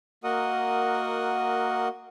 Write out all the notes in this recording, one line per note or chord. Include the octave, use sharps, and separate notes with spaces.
A#3 F#4 A#4 D#5 F#5 D#6